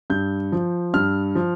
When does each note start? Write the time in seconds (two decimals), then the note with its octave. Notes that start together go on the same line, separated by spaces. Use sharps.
0.10 G2 G6
0.52 F3
0.94 G2 F6
1.35 F3